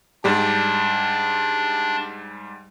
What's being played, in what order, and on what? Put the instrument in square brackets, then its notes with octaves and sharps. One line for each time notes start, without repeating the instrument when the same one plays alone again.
[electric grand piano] G#2 G3 G4 [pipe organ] D4